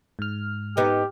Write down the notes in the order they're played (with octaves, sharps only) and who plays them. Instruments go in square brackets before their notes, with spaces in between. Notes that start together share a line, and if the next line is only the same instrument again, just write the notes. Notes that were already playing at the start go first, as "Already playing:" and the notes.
[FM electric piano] G#2 F6
[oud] B3 D#4 [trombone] G4